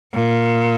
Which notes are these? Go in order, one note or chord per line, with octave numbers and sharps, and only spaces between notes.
A#2